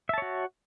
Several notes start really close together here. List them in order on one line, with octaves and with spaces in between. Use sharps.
E5 A5 C#5 F#4